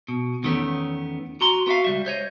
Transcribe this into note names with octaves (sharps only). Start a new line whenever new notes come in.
B2
E2 D#3 A3 B3 C#4
F#4 A#5 C6
B3 F#4 E5 F5
C#2 G3 E5
C5 C#5 D#5